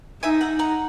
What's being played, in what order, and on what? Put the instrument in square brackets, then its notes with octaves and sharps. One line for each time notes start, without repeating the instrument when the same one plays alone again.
[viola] D#4 [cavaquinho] E5 G#5
[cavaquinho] F#5 A#5
F#5 A#5